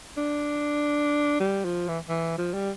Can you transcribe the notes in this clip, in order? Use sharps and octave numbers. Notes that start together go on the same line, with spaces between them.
D4
G3
F3
E3
E3
F3
G3